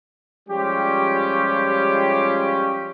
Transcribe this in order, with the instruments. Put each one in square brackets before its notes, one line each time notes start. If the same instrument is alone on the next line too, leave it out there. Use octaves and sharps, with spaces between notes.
[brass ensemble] F3 G3 G#3 C#4 F4 G4